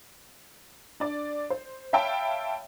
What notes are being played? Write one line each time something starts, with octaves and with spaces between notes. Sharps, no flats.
D4 D5
C5
C#5 E5 F5 G5 A5 B5